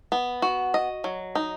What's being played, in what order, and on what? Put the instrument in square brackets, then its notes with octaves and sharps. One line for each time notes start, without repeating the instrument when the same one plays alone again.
[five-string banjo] B3
F#4
D#5
F#3
D#4